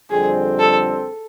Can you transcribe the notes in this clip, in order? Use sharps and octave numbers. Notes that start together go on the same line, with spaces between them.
F2 D3 G3 C4 G#4
A4